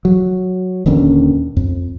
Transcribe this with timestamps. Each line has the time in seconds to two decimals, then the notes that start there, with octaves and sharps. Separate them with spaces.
0.05 F#3
0.86 D#1 D#2 D3 C#4
1.57 F2